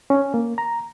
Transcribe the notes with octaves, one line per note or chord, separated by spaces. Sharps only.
C#4
A#3
A#5